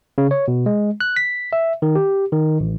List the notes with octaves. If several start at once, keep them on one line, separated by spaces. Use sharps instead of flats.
C#3
C#5
B2
G#3
F#6
B6
E5
D#3
G4
D#3
A1